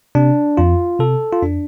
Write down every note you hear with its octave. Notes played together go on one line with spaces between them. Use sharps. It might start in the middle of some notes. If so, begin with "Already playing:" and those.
C3 D4
F2 F4
C3 A4
F4
F2 D4